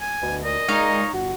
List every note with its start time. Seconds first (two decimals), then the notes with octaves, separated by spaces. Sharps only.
0.01 G#5
0.22 D2 B2
0.44 A#2 D#5
0.68 A#2 G#3 D#4 C#5 F5
1.14 G1 F#4